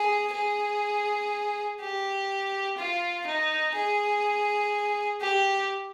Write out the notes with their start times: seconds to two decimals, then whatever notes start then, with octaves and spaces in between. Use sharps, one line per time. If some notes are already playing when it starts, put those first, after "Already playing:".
Already playing: G#4
0.33 G#4
1.80 G4
2.77 F4
3.26 D#4
3.75 G#4
5.21 G4